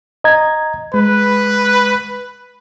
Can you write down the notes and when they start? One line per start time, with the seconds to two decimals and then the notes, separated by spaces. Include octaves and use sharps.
0.24 D#5 A#5 G#6
0.94 G#3 B4